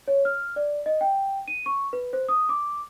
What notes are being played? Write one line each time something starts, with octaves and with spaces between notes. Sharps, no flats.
C#5
F6
D5
D#5
G5
D#7
C#6
B4
C5
D#6
D6